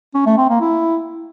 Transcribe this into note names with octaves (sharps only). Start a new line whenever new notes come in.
C#4
A3
C4
A#3
E4